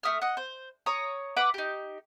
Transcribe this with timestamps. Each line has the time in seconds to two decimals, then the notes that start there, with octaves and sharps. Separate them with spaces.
0.03 A3 E5 D#6 F6
0.22 D#5 F#5
0.37 C5
0.86 C#5 A#5 D#6
1.37 B4 F#5 D6
1.54 D#4 G4